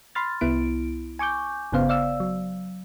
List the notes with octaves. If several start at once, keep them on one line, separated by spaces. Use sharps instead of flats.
B5 C6 F6 A6
C2 B3 E4 D7
G#5 C#6 D6 G6
G1 C#3 B3 C5 F5
D5 F5 E6
F#3